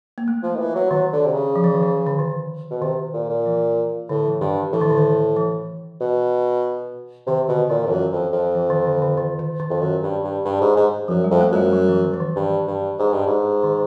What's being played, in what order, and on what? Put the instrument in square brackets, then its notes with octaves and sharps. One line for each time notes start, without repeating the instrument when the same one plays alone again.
[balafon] A#3
A3
[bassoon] F3
D#3
E3
F#3
[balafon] D#3 [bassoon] F#3
[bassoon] D3
C3
C#3
[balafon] F3
E3
D#3
E3
D3
D#3
[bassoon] B2
[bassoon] C3 [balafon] D#3
[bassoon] A#2
A#2
[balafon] E3
[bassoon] A2 [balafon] D3
[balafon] E3
[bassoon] G2 [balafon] D#3
[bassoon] A2 [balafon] E3
[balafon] D#3
D3
D#3
E3
[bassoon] B2
[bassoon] C3 [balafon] D#3
[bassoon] B2 [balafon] D3
[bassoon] A#2 [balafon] D#3
[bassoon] F2
[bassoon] F#2 [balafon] E3
[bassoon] F2
F2
[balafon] E3
D#3
D3
D3
D#3
D#3
D#3
[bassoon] F2
[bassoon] F#2 [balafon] D#3
[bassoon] G2
G2
G2
G#2
G#2
[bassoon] F#2 [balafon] F3
[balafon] G3
[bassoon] F2
[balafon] A3
[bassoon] F#2 [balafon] G3
[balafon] F#3
E3
D#3
E3
D#3
[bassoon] G2
G2
G#2
G2
G#2
[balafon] D#3